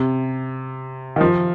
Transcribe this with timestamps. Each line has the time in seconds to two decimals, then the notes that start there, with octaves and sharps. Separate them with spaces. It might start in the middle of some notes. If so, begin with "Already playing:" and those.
Already playing: C3
1.16 D#3
1.21 F3